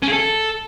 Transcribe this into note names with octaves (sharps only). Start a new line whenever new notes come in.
C#4
G#4
A4